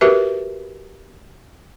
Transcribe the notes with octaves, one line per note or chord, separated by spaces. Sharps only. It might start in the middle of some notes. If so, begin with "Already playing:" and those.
F#4 G4 A#4 B4 E5